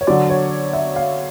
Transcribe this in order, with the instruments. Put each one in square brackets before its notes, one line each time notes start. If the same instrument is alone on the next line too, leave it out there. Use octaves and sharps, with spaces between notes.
[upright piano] C#5
D3 F#3 D5
C#5
E5
F5